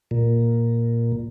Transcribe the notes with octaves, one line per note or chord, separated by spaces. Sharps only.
A#2